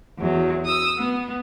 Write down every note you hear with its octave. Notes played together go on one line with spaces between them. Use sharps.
E2 F#3
D#6 E6
B3